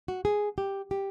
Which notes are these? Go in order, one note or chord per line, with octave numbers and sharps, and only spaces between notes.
F#4
G#4
G4
G4